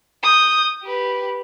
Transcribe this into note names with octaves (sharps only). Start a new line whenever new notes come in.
D#6 G6
G4 B4